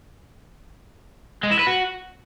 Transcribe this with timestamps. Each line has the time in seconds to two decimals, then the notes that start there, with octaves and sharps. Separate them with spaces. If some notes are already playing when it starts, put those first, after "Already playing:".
1.43 G#3
1.51 E4
1.59 B4
1.67 F#4